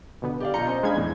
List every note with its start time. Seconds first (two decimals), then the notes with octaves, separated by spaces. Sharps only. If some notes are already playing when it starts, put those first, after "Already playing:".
0.22 B2 D3 B3
0.40 G4 D5 F5
0.54 B2 F4 A#5 G6 C#7
0.67 C#4 C5 D#5
0.83 G#3 D4 F5 B5 G#6
0.96 E2 A2